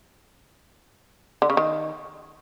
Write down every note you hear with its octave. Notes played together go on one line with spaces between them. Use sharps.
D3
C#3
D#3